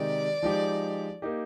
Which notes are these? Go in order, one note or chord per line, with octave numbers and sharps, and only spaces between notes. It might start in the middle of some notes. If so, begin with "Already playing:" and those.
Already playing: C3 D#3 G#3 D#4 G4 D5
F3 G#3 D#4 G4
A#3 D#4 G4